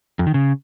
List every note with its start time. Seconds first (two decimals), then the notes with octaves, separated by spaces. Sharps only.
0.19 F2
0.27 D#3
0.34 C#3